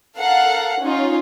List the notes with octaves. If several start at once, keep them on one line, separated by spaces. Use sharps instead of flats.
A4 A#4 F5 F#5
C#4 D#4 F4